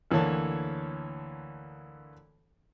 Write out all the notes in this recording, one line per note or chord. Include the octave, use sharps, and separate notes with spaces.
D2 E3 A#3 A4 C#5 A5